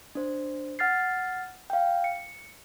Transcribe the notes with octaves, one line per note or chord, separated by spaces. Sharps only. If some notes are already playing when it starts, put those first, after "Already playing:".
D4 C5
F#5 F6 A6 C7
F5 G5
C#7